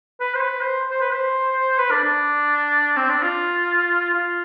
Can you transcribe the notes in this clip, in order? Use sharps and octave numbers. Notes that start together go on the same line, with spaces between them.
B4
C5
B4
C5
C5
B4
C5
B4
D4
D4
C4
D4
F4
F4